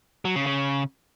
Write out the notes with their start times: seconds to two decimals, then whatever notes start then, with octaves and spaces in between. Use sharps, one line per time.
0.25 F#3
0.36 C#3
0.46 C#3